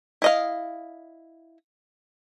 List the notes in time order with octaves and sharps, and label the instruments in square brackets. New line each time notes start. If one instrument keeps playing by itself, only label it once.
[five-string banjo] E4 D#5 F5